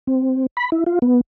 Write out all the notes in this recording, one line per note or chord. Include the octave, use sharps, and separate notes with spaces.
C4
B5
E4
F4
B3